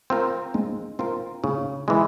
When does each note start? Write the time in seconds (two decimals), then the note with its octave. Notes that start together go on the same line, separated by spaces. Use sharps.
0.10 C4 F4 A#4
0.54 G#3
0.99 C4 F4 A#4
1.44 C#3
1.88 E3 G#3